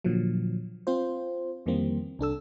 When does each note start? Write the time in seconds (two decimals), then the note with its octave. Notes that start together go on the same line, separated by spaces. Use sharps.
0.04 A#2 D3 F3 F#3
0.87 C4 F4 C5
1.66 F2 D#3 E3 G3 A#3 C4
2.19 C2 D4 A4 E6